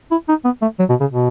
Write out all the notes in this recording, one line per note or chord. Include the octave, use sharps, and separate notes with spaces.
E4
D#4
B3
A3
F#3
B2
C#3
B2